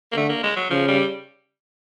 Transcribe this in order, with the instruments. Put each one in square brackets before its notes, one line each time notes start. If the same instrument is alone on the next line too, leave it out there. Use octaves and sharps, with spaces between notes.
[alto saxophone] A#3
[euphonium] D3 [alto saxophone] A3
[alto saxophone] A#3
G#3
F#3
[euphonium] C#3 [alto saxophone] F3
[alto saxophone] G3